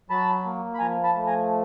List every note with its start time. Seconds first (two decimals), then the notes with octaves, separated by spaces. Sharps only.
0.10 F#3 A5 B5
0.45 A#3
0.75 B5
0.79 F3 G#5 A#5
1.04 A5 B5
1.15 A3
1.27 G#5 A#5